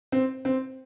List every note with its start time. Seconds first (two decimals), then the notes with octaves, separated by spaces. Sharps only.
0.12 C4
0.45 C4